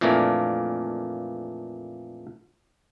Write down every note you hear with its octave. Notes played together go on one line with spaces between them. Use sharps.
F2 A#2 E3 A3 A#3 D4